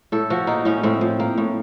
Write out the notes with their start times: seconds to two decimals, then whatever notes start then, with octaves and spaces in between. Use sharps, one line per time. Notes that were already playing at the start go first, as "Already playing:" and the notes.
0.12 A2 A4
0.30 F3 F#4
0.47 A#3 D#4
0.65 A2 C#4
0.83 A2 C4
1.01 F3
1.20 A#3
1.38 A2